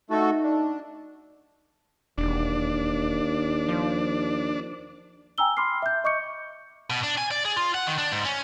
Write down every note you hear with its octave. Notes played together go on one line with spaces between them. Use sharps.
A3 D#4 F#4 A4
D4
E1 D#2 D4
F3
G5 G#5 A#5 E6 G7
B5 C6 D6 F6 C7
E5 G6
D#5 C#6 D6 G6 C#7
B2
D4
G#5
D5
G#4
F4
F#5
D#3
D4
G#2
C#4